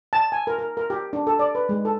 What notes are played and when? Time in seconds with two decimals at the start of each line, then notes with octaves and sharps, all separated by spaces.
0.13 A5
0.32 G#5
0.47 A#4
0.59 A#4
0.77 A#4
0.90 G4
1.13 D4
1.27 A4
1.39 D5
1.55 B4
1.69 G#3
1.85 A4